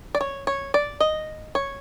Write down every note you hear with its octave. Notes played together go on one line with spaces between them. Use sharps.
D5
C#5
C#5
D5
D#5
C#5